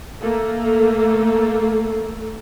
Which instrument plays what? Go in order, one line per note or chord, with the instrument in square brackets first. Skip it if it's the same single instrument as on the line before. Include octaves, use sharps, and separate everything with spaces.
[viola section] A3 A#3 A4